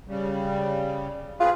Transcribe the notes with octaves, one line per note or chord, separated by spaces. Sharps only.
C#3 G3
C4 F4 G#4 B4